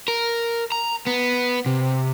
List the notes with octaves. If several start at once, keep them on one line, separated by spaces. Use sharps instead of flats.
A#4
A#5
B3
C3